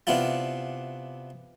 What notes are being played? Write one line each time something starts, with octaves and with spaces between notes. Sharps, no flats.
C3 B3 D4 E4 F4